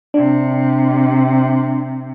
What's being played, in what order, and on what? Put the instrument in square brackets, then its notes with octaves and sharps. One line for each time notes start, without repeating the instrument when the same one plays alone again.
[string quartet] C3 [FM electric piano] D4